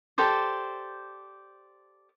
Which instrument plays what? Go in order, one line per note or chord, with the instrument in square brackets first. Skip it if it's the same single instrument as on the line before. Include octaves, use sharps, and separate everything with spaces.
[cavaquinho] G4 A4 C5 D5